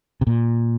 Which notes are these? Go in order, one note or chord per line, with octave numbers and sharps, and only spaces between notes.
C3
A#2